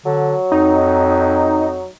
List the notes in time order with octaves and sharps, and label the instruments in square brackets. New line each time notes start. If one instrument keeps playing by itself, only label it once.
[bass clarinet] D3 [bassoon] F#3
[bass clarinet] F2 [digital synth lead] D#4